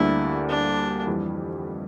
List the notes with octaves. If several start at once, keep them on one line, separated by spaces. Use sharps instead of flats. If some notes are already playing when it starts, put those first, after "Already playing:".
Already playing: D2 D3 G3 A#3 D4 E4
D4
F2 E3 G3